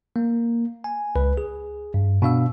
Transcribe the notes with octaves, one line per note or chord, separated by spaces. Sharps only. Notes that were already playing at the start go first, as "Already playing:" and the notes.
A#3
G#5
C#2 B4
G#4
G2
B2 D4 F5 E6